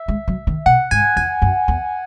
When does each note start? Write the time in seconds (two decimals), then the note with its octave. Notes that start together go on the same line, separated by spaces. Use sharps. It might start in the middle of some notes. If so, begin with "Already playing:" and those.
Already playing: E5
0.08 G#3
0.28 F#3
0.47 D#3
0.66 B2 F#5
0.91 G#2 G#5
1.16 E2 G#5
1.42 F#2
1.68 E2